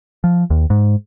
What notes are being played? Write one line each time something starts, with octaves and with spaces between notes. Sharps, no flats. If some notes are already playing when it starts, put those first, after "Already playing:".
F3
D#2
G#2